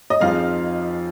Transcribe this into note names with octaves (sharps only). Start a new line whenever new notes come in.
D#5
F2 F3 C4 D#4 G#4 F5